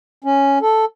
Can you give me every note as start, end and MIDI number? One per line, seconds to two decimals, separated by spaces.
0.24 0.59 61
0.61 0.85 69